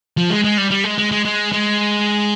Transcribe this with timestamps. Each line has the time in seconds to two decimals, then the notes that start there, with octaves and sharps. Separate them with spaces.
0.17 F3
0.30 G#3
0.44 G#3
0.57 G3
0.71 G3
0.84 G#3
0.98 G#3
1.11 G#3
1.25 G#3
1.53 G#3